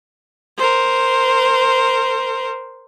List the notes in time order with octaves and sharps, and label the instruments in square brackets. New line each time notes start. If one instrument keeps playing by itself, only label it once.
[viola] A#4 C5